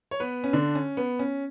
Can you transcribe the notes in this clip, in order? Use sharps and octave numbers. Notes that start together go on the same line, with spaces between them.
C#5
B3 B4
C#4
D3 D4
C#4
B3
C#4